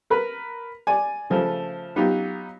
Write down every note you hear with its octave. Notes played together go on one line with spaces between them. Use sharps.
A#4 B4
D5 G#5
C#3 F3 A3
F#3 B3 D#4 F4 G4